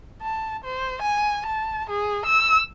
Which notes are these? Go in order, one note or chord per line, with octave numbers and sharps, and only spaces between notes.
A5
C5
G#5
A5
G#4
E6